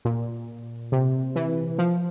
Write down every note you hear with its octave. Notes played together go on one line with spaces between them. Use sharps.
A#2
C3
E3
F3